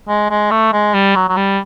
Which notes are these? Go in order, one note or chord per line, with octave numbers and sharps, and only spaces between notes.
G#3
G#3
A3
G#3
G3
F#3
F#3
G3